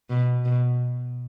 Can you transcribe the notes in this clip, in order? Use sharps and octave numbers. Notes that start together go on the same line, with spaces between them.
B2
B2